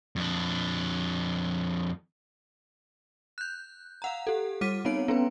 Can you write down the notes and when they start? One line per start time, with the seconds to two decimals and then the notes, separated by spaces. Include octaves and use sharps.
0.16 F2 D4
3.38 F#6 G6
4.02 F5 F#5 A#5
4.27 G4 A4
4.61 G3 D6 F6 B6 D#7
4.85 B3 C4 D#4 C#5 D7
5.08 B3 C#4 B4